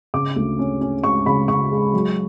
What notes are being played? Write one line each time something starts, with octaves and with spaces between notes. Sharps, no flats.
C#3 D6
D2
C#4
C#4
G#3 C#6
C#3 B5
C#3 C#6
G#3
F#3